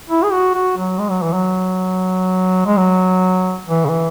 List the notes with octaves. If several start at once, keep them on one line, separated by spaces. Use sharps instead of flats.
E4
G#4
F#4
F#4
F#3
G#3
F#3
E3
F#3
G#3
F#3
E3
C#3
E3